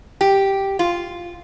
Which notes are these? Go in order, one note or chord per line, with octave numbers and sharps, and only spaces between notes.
G4
F4